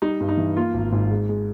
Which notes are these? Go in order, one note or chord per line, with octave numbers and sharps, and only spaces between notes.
G3 D#4
G2
D#4
E3
A#3 F4
G#1
G#2
G#3
G#3